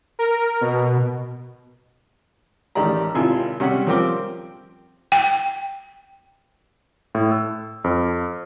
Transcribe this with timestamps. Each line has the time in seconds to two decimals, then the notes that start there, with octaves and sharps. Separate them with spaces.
0.19 A#4
0.61 B2
2.75 A1 D#3 G4 D5 A#5
3.15 G#1 C3 E4 F4 G#5
3.60 C3 G3 C#4 F#5
3.86 F3 G3 C4 A#4 G5 D6
5.12 G5
7.15 A2
7.31 E6
7.84 F2